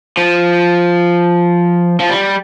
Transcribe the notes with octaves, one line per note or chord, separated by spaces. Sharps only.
F3
F3
G3